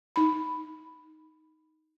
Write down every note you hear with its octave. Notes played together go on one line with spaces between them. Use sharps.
D#4 B5